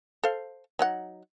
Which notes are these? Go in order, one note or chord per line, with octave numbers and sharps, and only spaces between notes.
A4 C5 F5
F#3 D#4 F#5